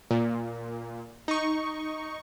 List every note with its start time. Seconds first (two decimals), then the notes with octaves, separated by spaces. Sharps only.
0.11 A#2
1.28 D#4 C#6